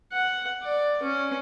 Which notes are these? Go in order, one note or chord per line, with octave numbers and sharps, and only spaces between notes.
F#5
D5
C#4